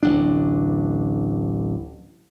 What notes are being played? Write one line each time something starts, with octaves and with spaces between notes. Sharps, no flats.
D1 A1 D2 D4